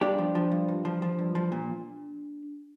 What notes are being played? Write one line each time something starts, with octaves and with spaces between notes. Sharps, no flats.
G2 D4 G4
F3
F3
G2
G2
F3
F3
G2
F3
A#2